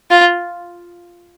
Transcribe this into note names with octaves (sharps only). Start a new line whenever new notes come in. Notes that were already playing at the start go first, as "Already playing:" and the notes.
F4